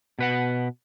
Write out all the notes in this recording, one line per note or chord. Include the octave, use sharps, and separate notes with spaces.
B2 B4 F#5